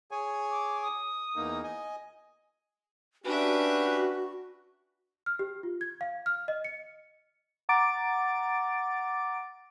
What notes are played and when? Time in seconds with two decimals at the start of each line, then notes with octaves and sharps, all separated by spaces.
0.11 G#4 C#5 G#5
0.51 D6
0.82 D#6
1.36 E2 A#3 D#4
1.64 D#5 G#5
3.25 C#4 D4 F#4 G4 B4 E5
5.26 F6
5.39 G4
5.63 F4
5.81 G#6
6.01 F5
6.26 F6
6.48 D#5
6.64 C#7
7.69 F#5 A#5 D6 A6 D7